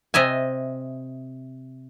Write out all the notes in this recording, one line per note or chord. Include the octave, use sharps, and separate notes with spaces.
C3 D#5 E5 G#5